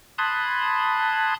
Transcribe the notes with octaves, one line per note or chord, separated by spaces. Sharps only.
A5 B5 C6 D#6 F#6 G#6